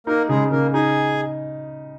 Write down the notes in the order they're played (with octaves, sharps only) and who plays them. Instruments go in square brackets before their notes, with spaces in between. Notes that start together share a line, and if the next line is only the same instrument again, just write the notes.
[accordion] A#3 A#4 [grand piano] D#4
[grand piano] C#3 [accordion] G#3 G#4
[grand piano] C#3 [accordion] A#3 A#4
[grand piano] D#4 [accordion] G#4 G#5